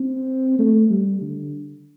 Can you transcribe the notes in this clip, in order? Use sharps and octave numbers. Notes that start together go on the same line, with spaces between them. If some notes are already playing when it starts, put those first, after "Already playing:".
Already playing: C4
A3
G3
D3